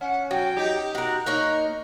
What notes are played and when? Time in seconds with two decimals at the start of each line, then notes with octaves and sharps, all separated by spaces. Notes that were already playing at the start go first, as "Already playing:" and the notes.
0.01 C#4 F#5
0.31 F#3 G5
0.56 D#4 G4
0.95 F#4 A#4 F#6
1.26 A#3 D#4 A#4 C#5